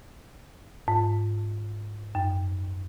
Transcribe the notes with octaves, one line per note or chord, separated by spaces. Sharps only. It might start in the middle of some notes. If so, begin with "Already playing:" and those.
G#2
F#2